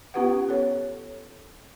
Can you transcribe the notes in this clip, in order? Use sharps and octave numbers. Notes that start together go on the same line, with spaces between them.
B3 C#4 F4 G4 B4 F#5
A4 C#5